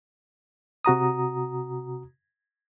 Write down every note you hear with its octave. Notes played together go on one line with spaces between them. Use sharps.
C3 F#4 A#5 D#6